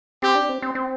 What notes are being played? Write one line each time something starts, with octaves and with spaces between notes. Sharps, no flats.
C4 G4
D4
C4
C4
C4